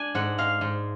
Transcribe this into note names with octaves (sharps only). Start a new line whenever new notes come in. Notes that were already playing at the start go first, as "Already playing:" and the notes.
Already playing: D4 G#5
G#2 F#5
G#3 F5
G#2